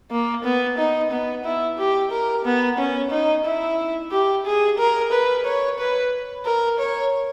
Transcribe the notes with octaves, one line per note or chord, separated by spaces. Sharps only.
A#3
B3
D#4
B3
E4
G4
A#4
B3
C#4
D#4
E4
G4
G#4
A#4
B4
C#5
B4
A#4
C#5